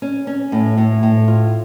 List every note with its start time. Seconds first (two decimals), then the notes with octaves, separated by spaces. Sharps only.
0.02 C#4
0.27 C#4
0.52 A2
0.78 A2
1.03 A2
1.28 F4